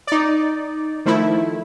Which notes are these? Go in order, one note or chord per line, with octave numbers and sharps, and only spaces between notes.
D#4 D5
D#3 F3 A3 E4